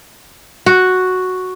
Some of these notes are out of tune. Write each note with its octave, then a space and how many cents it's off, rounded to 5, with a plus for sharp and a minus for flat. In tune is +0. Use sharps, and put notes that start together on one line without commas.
F#4 +0